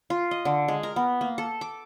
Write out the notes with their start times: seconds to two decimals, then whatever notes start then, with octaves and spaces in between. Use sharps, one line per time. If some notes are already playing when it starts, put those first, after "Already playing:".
0.10 F4
0.31 D#5
0.45 D3
0.68 G#3
0.83 A#4
0.96 B3
1.21 A#3
1.38 A4
1.61 D6